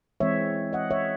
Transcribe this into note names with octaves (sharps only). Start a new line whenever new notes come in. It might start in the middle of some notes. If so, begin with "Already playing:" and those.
E3 G#3 C4 C#5 E5
D#5 F#5
C#5 E5